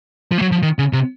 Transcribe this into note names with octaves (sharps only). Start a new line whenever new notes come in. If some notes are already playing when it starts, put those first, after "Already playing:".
F3
A3
F#3
F3
D#3
C#3
C3